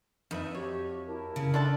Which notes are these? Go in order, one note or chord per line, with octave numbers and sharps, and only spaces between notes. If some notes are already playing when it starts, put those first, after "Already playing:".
F2 D#4 B4 E5
F#4 G4 C#5
E4 A#4 A5
C#3
D4 E4 A4 A5 C6 E6